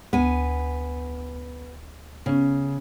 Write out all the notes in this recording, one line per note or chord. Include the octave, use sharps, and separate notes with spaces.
D2 B3 G#5
C#3 B3 C#4